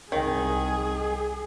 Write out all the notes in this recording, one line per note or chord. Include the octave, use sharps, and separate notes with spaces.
C2 D#3 G#4